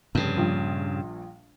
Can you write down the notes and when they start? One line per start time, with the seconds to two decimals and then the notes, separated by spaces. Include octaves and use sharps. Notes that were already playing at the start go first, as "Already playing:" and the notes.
0.15 F1 G2 C#3
0.37 A#1 A#2 G3